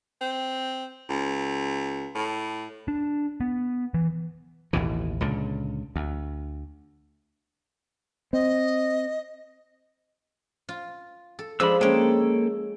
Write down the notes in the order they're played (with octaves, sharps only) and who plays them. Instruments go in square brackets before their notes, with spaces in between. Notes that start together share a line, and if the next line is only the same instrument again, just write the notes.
[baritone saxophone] C4
C#2
A2
[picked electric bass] D4
B3
E3
[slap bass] A1 D#2 B2 E3
C#2 A#2 D3
D2
[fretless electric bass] C4 [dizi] D#5
[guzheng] F4
A4
[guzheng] F3 G#3 D4 [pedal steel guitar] B5 E6
[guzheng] G#3 C#4 [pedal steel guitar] A#3 A4 G5